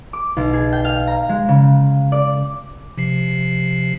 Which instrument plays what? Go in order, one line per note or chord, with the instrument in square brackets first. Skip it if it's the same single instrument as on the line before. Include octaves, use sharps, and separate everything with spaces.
[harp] D6
B1
G#4
G5
F5
A#5
G#3
C#3
D5
[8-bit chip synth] C3 F3 C7